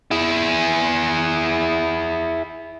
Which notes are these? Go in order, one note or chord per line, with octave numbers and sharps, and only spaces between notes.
E4 G#4